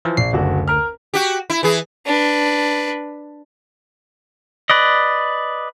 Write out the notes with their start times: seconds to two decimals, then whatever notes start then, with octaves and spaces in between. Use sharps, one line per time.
0.05 E3 F3
0.17 A#1 C7
0.33 F#1 D2 D3 F#4
0.68 A#4 F6
1.14 F#4 G4
1.50 E4
1.63 E3 G#4
2.06 D4 B4
4.70 B4 D5 D#5